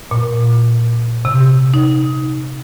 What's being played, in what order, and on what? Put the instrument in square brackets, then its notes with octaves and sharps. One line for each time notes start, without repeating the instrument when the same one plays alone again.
[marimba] A#2
C3
D#4